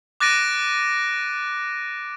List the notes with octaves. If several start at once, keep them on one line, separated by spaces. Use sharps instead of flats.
D6 F#6 A6 A#6 D7 D#7